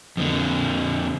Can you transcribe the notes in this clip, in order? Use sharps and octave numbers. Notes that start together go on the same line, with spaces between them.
F2 D3